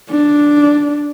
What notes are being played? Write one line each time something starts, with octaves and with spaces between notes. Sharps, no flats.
D4